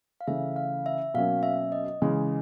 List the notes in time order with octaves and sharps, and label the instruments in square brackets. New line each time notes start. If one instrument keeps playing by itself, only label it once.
[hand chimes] F5
[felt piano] C#3 E3 A3 C#4 [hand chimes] E5
[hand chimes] F5
E5
[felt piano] B2 F#3 A#3 C#4 [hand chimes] F5
[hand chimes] E5
D#5
[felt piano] C#3 E3 G#3 C#4